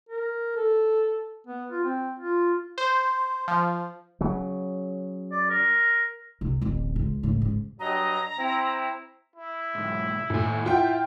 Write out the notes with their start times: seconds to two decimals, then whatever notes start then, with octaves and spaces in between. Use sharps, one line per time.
0.09 A#4
0.56 A4
1.47 B3
1.71 F4
1.84 C4
2.19 F4
2.78 C5
3.48 F3
4.21 C#3 F#3
5.32 D5
5.50 A#4
6.41 C2
6.61 D1 A1
6.96 C#2
7.23 A2 C#3
7.42 G#2
7.79 G2 F#3 D#5 A#5
8.37 C4 E4
9.36 E4
9.75 B1 G#2
10.30 D#2 A2 G#5
10.66 E4 F4 E5 F#5 G5